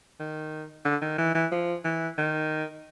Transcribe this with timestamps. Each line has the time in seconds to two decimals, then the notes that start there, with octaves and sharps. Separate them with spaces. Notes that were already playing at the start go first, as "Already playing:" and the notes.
0.20 D#3
0.85 D3
1.02 D#3
1.18 E3
1.35 E3
1.52 F3
1.85 E3
2.18 D#3